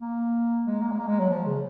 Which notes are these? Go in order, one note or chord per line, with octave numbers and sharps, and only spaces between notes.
A#3
G#3
A#3
G#3
A#3
G#3
F#3
F3
C#3